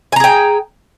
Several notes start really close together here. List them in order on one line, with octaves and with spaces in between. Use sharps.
G#5 A#5 G#4 G5